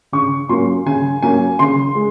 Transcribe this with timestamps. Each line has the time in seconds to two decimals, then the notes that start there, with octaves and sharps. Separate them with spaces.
0.12 C#3 C#6
0.49 F#3 A#3 C#4 C6
0.86 C#3 G#5
1.23 F#3 A#3 C#4 G#5
1.59 C#3 C6
1.95 G#3